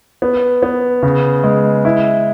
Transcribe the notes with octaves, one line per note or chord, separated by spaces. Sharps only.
B3
B3
C#3
G#3
E4